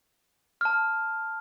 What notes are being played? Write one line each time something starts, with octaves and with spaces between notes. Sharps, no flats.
A5 F6